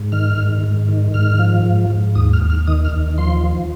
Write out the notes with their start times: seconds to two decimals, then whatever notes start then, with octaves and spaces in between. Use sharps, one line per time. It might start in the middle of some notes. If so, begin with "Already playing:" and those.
Already playing: G#2
0.12 D#3 F6
0.38 G#2
0.64 G#2
0.89 D#3
1.14 G#2 F6
1.39 F3
1.65 G#2
1.90 G#2
2.15 D#2 D#6
2.33 F6
2.42 D#2
2.50 F6
2.67 D#3 D#6
2.85 F6
2.92 D#2
3.18 F3 C6
3.43 F3